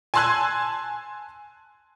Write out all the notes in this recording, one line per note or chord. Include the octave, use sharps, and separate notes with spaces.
G#5 A5 C6 E6 F#6 G#6